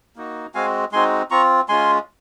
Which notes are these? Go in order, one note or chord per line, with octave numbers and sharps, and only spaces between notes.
A#3 D#4 F#4
G#3 C4 F#4 F5 G#5
G#3 C4 D#4 F#4 G#5 C6
C4 F4 A#5 C#6
G#3 C#4 F4 G#5 C6